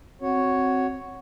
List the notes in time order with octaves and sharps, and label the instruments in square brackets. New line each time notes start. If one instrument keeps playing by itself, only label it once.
[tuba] C4 [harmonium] F#4 C#5